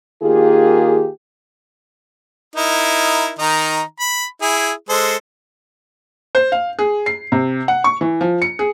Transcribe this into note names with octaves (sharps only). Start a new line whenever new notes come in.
D#3 A#3 F4 G4 G#4
D#4 E4 A#4
D#3 D#4 A#5
B5
E4 G#4
G#3 A4 C5
C5
F5
G#4
C7
C3
F#5
C#6
E3
F3
C#7
G#4